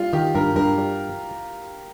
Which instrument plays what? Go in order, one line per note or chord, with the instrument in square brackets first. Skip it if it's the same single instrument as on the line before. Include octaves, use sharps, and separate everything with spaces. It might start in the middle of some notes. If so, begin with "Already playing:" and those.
Already playing: [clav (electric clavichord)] G3 [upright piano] F4
[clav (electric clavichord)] D#3 [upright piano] G4
[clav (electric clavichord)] G2 [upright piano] A#4
[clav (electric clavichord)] G2 [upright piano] A#4
[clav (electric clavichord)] G3